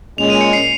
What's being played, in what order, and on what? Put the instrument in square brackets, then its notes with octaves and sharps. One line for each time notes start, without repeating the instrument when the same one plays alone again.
[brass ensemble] A#2 G#3 C#4 [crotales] F7
[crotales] D#7
C#7
C7